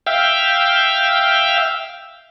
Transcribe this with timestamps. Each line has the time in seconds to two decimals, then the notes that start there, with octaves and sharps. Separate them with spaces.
0.07 E5 F5 G5